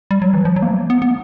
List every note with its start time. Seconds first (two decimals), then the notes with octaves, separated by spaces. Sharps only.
0.11 G3
0.22 F#3
0.34 E3
0.45 F3
0.56 F#3
0.62 A#3
0.68 A3
0.78 A#3
0.90 B3
1.02 B3